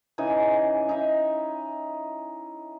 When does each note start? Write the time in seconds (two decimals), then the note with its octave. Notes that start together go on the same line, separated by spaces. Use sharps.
0.18 C#3 E3 D#4 G#5
0.89 D#4 E4 E5